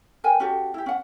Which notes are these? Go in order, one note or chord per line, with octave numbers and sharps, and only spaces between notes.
A#4 B4 G5 G#5
C#4 F#4 G4 A4
E4 G4
C#4 F#5